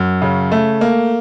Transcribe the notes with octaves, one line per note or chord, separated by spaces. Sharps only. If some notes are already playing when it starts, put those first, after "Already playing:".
Already playing: F#2
C#3
A3
A#3